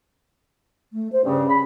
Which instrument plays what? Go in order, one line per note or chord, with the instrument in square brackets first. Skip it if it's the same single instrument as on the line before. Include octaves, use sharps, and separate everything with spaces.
[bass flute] A3
C5
[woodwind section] G2 C#3 [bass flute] C#4
[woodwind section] B5